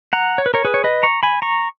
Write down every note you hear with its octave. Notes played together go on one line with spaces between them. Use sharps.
F#5 A#5
C#5
B4
A#4 C#5
G#4 B4
C#5
B4 D#5
A#5 C#6
G#5 B5
A#5 C#6